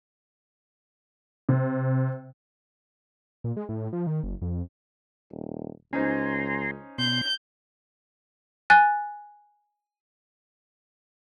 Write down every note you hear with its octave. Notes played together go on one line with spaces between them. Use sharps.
C3
A#2
G#3
A2
F3
D#3
F#1
F2
D#1
C#2 C#4 D#4 C5 G#5 A#5 C6
B2 C6 G6
G#5 F#6 A6